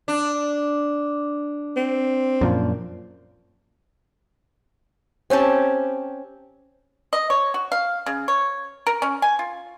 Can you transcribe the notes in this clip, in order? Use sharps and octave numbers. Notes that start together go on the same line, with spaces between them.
D4
C4
F#2 A#2 F3
C4 C#4 G4 A5
D#5
C#5
F#4
F5
C#3
C#5
A#4
C#4
G#5
F4